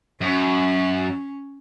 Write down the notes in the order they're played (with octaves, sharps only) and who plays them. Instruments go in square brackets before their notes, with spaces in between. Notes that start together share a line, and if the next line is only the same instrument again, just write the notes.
[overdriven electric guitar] F#2 [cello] C#4